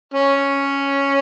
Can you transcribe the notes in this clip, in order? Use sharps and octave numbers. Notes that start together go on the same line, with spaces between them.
C#4